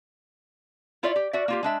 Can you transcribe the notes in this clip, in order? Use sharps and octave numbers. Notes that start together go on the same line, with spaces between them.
E4 F4 C#5 D5 E5
G4
F#4 D5 E5
A#3 F4 G4
G#3 D4 E5